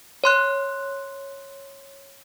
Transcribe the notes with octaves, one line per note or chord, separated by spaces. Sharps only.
C#5 C6 F#6